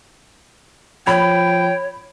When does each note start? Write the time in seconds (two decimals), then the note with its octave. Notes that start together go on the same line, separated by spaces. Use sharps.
1.07 F3 C#5 G5 B5